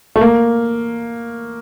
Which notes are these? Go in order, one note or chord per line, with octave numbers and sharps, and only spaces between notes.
A3
A#3